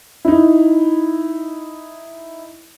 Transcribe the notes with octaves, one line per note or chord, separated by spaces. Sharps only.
D#4 E4